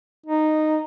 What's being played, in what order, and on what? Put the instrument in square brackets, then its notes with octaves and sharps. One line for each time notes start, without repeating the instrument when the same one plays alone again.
[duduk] D#4